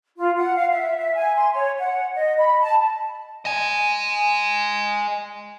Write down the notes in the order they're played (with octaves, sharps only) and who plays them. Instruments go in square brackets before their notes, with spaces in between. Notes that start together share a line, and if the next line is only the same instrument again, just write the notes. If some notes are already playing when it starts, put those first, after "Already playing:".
[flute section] F4
F#5
F5
E5
E5
G#5
C6
C#5
F#5
D#5
B5
A5
[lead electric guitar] D#5 G#5